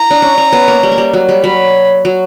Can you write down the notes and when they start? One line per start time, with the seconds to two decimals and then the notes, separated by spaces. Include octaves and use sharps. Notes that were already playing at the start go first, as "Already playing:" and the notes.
Already playing: E4 A#5
0.11 D4
0.22 C#4
0.38 C#4
0.53 B3
0.68 A#3
0.83 G3
0.92 A#3
0.98 G3
1.13 F#3
1.29 G3
1.44 F#3 B5
2.05 F#3